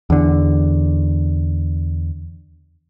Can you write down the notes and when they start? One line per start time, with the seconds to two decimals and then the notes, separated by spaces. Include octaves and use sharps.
0.10 E2 D3